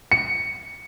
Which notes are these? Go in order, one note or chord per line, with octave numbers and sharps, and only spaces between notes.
C#7